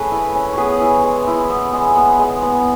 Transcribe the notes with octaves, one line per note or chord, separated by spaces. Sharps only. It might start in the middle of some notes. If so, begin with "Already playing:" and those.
Already playing: A3 C#4 G#4 B4 C#5
E4
C#4
B3 G#4 B4 C#5
E4
G#3
E4
B3
G#3
B3
G#3
B3